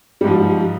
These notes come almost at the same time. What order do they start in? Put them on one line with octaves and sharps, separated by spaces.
G3 G#2 F3